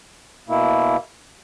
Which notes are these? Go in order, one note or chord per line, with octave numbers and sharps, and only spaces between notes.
B2 A#3 E4